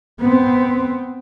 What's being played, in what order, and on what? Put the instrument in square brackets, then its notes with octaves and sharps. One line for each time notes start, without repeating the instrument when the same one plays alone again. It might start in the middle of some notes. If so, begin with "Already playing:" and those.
[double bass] B3 C4